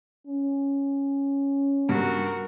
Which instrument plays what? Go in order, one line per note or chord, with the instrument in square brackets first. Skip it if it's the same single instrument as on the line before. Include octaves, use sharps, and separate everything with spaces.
[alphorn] C#4
[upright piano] G2 [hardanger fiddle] F#4 A#4